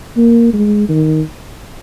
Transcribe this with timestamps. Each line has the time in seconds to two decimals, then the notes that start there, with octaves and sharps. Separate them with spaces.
0.17 A#3
0.53 G#3
0.89 D#3